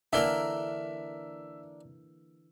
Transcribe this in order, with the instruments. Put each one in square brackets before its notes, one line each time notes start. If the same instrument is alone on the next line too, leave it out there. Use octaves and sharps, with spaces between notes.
[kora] D3 E3 A#3 [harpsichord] D4 A#4 [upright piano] E5 G7